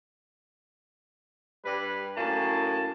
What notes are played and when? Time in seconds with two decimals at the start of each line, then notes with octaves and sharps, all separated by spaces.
1.65 G2 G3 B4
2.17 F#2 A2 A#3 G#5 A5